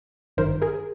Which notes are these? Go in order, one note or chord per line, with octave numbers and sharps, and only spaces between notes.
G#1 G2 D#3 A#4 C5
G#4 A#4